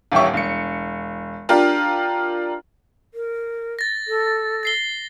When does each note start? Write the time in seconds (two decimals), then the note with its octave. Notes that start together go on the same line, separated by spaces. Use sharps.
0.12 D#1 A1 G4 E5 C#6
0.33 E1 C#7
1.49 D4 F4 G4 A#4
3.14 A#4
3.79 A6 A#6
4.08 A4
4.63 A6 C7 G7